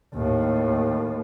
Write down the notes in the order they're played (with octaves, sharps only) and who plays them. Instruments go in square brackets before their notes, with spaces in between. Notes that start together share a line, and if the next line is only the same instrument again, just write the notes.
[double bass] D#2 A2